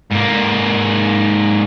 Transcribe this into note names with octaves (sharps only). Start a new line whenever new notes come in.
G#2 A#3